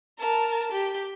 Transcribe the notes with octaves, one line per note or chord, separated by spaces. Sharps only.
A#4 A5
G4